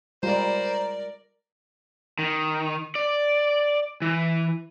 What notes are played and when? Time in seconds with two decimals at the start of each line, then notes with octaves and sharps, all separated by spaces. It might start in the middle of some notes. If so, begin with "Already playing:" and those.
0.23 G3 G#3 F4 A#4 C5 D5 A#5
2.19 D#3
2.95 D5
4.02 E3